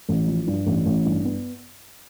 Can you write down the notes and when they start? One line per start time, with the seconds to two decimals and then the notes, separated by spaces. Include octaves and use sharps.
0.09 A1
0.27 F3
0.47 G2
0.66 A1
0.86 A1
1.05 G2
1.25 B3